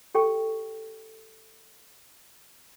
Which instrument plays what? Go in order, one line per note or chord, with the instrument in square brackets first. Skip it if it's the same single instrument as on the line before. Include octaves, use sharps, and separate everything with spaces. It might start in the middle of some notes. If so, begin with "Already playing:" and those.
[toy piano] G4 A4 G5 C#6